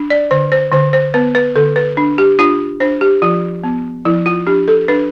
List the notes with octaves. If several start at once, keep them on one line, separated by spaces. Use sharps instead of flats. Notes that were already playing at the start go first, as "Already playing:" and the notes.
Already playing: D4
D5
D3 C5
C5
D3 C5
C5
B3 B4
B4
D3 A4
B4
D4
G4
D4 F4
D4 C5
G4
F3 F4
B3
F3 E4
F4
D4 G4
A4
D4 B4